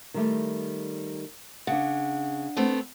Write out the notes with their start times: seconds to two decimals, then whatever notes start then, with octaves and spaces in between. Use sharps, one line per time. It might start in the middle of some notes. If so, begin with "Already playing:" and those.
0.14 D#3 G3 A3
1.67 C#3 D4 F#5
2.56 A3 B3 C4